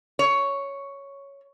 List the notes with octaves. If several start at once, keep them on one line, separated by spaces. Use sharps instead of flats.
C#5